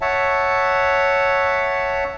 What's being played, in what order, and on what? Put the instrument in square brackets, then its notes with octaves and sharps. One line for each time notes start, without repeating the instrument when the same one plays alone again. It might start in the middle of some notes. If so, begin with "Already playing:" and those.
[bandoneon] C#5 E5 F#5 A5